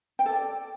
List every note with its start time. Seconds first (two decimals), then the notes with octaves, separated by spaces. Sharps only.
0.19 G5
0.26 A4
0.32 D5